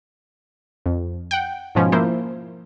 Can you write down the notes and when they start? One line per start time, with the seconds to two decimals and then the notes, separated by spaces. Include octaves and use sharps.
0.86 F2
1.31 F#5 G5
1.75 G#2 B2 F3 C#4
1.92 F3 A#3 E4 C5